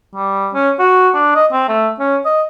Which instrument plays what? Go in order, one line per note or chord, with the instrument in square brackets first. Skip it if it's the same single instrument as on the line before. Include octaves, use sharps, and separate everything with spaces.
[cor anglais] G3
C#4
F#4
D4
D#5
C4
A3
C#4
D#5